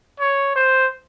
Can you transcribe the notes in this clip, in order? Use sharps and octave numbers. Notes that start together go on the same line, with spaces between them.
C#5
C5